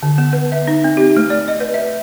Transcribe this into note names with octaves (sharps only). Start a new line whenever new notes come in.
D3
B3
B4
E5
D#4
C4
G4
A3
D5
D#5
B4
E5